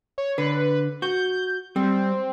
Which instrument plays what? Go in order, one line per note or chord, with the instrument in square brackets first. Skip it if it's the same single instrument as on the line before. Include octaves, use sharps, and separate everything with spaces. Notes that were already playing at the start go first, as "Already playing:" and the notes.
[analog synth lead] C#5
[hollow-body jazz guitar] D3 [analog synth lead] B4
[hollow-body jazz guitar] F#4 [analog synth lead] G6
[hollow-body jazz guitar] G3 [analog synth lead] C4